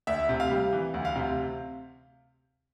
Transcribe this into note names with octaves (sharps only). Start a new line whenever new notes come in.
D2 E5
C3
F5
G3
E3
D2
F5
C3